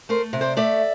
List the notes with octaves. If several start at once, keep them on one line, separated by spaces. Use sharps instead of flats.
A3 A#4 C5
C3
C5 D5
A3 D5 E5